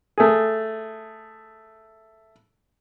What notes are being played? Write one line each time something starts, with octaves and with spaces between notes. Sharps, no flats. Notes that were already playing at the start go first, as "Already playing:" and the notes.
A3 G#4